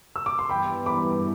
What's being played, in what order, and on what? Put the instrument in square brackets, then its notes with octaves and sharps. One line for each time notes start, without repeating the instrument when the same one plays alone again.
[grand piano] E6
D6
C6
[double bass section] G2 E3 G3 B3 [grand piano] G5 B5
[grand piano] B5 D6